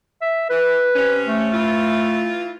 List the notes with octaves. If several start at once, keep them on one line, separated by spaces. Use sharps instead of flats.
E5
E3 B4
C3 C#4
A3
E3 F4